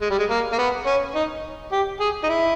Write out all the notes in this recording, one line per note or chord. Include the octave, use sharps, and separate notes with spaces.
G#3
G3
G#3
A#3
A#3
B3
C#4
D#4
G4
G#4
D#4
E4